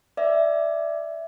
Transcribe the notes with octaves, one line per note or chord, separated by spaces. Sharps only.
D5 E5